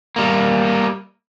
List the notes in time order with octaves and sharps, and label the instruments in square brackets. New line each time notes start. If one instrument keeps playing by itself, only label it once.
[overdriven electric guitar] G3 A#3